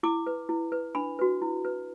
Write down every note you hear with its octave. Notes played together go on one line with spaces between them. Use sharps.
E4 D6
B4
E4
B4
D4 B5
F#4 B4
E4
B4